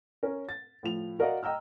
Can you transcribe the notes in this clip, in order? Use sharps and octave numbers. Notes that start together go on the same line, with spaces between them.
C#4 A#4
A6
A2 F3 F7
F#4 A#4 D5 D#5 F5 F#5
D#5 G5 A#5 E6 F6